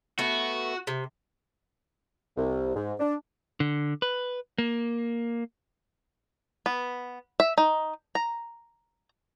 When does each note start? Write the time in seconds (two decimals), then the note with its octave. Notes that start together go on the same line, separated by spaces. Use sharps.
0.19 A3 B3 F#4
0.87 C3
2.37 C2
2.75 G#2
3.00 D4
3.60 D3
4.02 B4
4.58 A#3
6.66 B3
7.40 E5
7.58 D#4
8.15 A#5